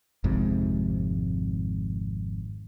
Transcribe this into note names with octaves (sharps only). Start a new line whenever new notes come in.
G#1 F2 G#2 C3